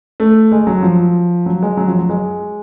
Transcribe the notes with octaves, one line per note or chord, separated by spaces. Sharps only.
A3
G#3
F#3
F3
F#3
G#3
F#3
F3
F#3
G#3